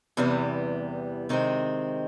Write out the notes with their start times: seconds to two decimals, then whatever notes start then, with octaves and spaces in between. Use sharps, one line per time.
0.17 E2 C3 E3 G3 B3
1.29 C3 D#3 G#3 C4